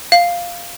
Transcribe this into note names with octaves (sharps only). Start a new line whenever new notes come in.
F5